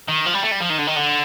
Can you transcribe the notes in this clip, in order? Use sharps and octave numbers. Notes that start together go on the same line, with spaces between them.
D#3
F3
G3
A3
G3
F3
D#3
D3
D#3
D3